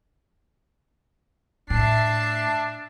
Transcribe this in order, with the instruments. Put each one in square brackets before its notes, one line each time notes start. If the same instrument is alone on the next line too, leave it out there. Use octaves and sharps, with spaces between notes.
[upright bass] A2 [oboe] D4 [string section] E5 A5 C7